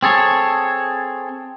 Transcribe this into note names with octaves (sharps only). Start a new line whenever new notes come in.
C4 G#4 A4 C#5